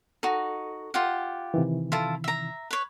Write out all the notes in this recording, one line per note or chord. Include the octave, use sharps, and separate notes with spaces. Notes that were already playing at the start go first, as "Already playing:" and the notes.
D#4 F#4 A4
F4 G4 F#5
C3 D#3 E3
E4 F4 A4
E5 A#5
B4 C#5